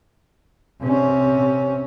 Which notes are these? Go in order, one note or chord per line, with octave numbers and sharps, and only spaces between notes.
C3 C#4